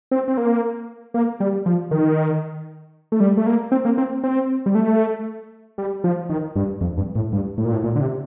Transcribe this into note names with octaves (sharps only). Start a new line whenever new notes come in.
C4
C4
A#3
A#3
G3
F3
D#3
A3
G3
A3
A#3
C4
A#3
C4
C4
G3
A3
G3
F3
D#3
G2
F2
G2
A2
G2
A2
A#2
A2
A#2
D3
C3